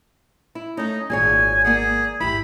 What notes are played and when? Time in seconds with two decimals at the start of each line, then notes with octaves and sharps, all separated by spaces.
0.55 E4
0.77 A3 C#4 D#4
1.10 G#1 A#2 G#4 C#5 G#5
1.64 A#3 G#4 D5 F#5
2.20 G#1 E2 E4 G4 B5